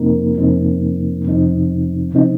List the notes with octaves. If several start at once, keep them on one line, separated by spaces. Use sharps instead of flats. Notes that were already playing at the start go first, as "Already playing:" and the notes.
Already playing: F2 C3 F3 A#3 C4 D#4 A#4
F2 C3 F3 C4 D#4
F2 C3 F3 C4 D#4
C3 F3 C4 D#4